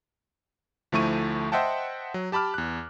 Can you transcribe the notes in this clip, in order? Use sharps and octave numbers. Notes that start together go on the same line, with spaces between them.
D2 F3 A3 E4 C#6 D#7
C5 D#5 E5 F#5 G5 A5
F#3
G4 A5 B5 D6 F6
E2 F#6